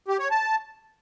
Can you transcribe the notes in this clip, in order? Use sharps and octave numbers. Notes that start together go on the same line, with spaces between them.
G4
C#5
A5